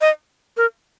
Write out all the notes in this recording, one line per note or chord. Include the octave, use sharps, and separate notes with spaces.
D#5
A#4